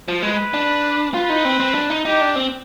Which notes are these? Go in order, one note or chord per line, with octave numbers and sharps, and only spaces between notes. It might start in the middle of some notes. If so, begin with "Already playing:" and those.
F3
G#3 B4
D4
F4 B4
D#4
C4
C4
D4
D#4
D#4 G4
D4
C4